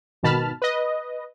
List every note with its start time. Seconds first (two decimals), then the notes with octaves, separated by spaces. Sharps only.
0.23 G#1 B2 D#3 A5 B5 F6
0.62 B4 D#5